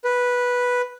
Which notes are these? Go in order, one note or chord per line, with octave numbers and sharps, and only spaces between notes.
B4